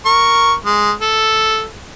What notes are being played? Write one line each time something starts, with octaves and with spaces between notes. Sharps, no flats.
A#4 C#6
G#3
A4